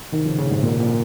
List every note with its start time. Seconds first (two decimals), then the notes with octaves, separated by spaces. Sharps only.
0.12 C3 D#3
0.25 C#3 F3
0.38 A#2 C#3
0.50 G#2 C3
0.63 A#2
0.80 A#2